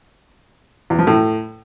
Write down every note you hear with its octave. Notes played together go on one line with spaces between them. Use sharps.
E2
F3
A2